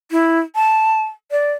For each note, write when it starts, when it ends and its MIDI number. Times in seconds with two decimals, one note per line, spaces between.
0.11 0.39 64
0.55 1.03 81
1.31 1.52 74